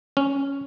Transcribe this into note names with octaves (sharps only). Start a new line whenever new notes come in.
C#4